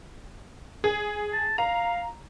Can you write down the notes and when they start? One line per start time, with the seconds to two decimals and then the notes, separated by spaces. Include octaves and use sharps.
0.84 G#4
1.33 A5
1.58 F5 A#5